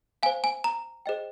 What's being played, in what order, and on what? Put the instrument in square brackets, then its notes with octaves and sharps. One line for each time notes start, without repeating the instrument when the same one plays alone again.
[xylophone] F5 G#5
C5
G#5
A#5
G#4 C5 D#5 G5